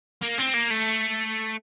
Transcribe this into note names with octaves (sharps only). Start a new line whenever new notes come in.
A#3
C4
A#3
A3